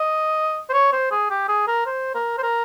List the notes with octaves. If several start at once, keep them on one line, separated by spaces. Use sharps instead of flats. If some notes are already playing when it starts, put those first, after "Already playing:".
Already playing: D#5
C5
C#5
C5
G#4
G4
G#4
A#4
C5
A#4
C5
A#4